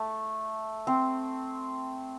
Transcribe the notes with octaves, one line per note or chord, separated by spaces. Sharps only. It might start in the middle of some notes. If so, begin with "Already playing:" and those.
Already playing: A3
C4